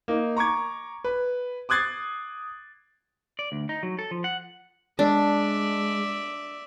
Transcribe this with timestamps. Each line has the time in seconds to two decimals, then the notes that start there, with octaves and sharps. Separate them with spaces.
0.08 A#3 D#4
0.37 A#5 C#6 D6 G#6
1.04 B4
1.69 D6 D#6 F#6 G#6 A6 C7
3.39 D5
3.52 D2
3.69 D#4
3.83 F#3
3.99 A4
4.11 F3
4.24 F#5
4.99 G#3 D4 D5 E5